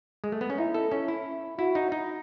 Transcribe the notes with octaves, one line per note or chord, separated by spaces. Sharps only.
G#3
A3
B3
C#4
D#4 E4
A4
C#4
E4
E4 F#4
D#4
D#4